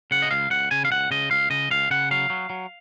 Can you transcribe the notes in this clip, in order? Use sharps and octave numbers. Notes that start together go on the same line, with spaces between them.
C#3 F#5
D#5
C#2 F5
C#2 F#5
C#3 G#5
F5
C#2 F#5
C#3 D#5
C#2 F5
C#3 D#5
C#2 F5
C#3 F#5
F#3 F5
F#3
F#3